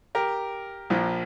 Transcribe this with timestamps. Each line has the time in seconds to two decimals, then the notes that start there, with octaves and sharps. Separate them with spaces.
0.15 G4 A#4
0.90 A#1 A#2 F3